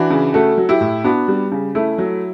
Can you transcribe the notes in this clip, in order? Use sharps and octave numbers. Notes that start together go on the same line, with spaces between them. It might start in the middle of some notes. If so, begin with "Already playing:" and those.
Already playing: E3 D4 F#4
C#3
A3 F#4 A4
F#3
E4 G4
A2
B3 D4 F#4
G3
C#3
A3 E4
F#3